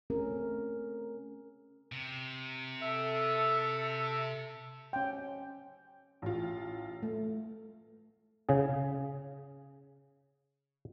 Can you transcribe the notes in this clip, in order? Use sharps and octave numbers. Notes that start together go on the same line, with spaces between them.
A3 C4 C#4 G#4 A#4
C3
A4 E5
C#4 G5
A1 F4
A3
C#3 G#4